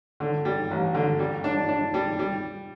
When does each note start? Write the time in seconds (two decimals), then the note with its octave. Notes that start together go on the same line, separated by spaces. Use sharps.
0.20 D3
0.45 G3
0.71 A1
0.94 D3
1.19 G3
1.44 D4
1.69 D4
1.94 G3
2.19 G3